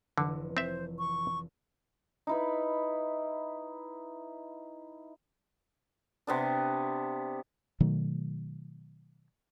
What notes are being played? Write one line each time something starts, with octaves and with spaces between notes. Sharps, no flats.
F1 D3 E3
C4 C5 E5
C#6
D#4 E4 B4
C3 B3 D4
B2 D#3 F#3 A3